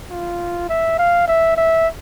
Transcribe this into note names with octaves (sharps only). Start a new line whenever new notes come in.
F4
E5
F5
E5
E5